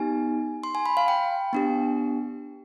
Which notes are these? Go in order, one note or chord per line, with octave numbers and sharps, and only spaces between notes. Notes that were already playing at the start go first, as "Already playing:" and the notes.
Already playing: B3 D#4 G4 G#5
C6
G#5
B5
F5
G5
B3 D4 G4